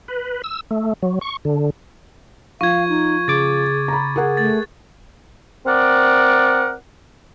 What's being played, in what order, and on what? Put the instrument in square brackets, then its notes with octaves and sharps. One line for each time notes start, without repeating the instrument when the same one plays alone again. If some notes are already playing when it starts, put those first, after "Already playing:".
[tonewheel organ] B4
E6
A3
F#3
C#6
D3
[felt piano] F3 [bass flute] F5 [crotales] C#6 G#6
[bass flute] D#4
[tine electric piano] C#3 D6 [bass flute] G#4 [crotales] A6
[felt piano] A#5 B5
G#4 A#4 F#5
[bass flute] A3 [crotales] A6
[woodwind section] C4 A#4 D5 F#5